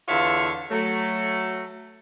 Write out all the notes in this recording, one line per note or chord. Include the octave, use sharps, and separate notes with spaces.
E2 D3 F4 C#5 E5 F5
F#3 A3